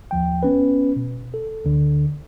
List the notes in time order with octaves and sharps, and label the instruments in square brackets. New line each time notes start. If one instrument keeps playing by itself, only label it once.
[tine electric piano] D#2 F3 G5
B3 C#4 B4
B2
A4
D2 D3